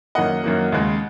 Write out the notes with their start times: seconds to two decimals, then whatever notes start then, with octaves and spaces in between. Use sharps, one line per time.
0.15 F#2 D#3 A#3 D#5 F#5
0.44 F#2 D#3 A#3
0.72 D#2 C#3 G#3